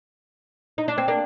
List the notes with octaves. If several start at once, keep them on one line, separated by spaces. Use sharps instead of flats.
D#4
D4
C4
A#3 D4